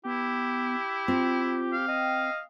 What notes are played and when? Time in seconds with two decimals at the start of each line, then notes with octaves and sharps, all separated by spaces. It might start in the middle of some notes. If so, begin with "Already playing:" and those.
0.05 B3 E4 G4
1.08 C4 F4
1.73 F5
1.88 D#5 G5